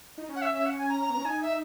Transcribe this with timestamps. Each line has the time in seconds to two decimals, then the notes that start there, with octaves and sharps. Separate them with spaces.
0.18 D#4
0.29 C#4
0.36 F#5
0.42 E5
0.54 E5
0.66 F#5
0.78 G#5
0.89 A#5
1.02 A#5
1.10 B3
1.13 A#5
1.17 C#4
1.25 D#4 G#5
1.42 E5